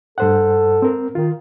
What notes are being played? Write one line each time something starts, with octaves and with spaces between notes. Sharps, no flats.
G2 A4 C5 F#5
C4 A#4
D#3 F4